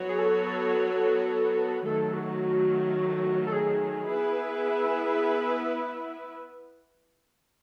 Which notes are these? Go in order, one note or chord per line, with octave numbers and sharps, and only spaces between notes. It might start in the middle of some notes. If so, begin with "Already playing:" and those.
Already playing: F#3 B3 F#4 C#5
G#4
A4
A4
D#3 F#3 A3 A4
F#4
A4
G#4
B3 E4 B4 E5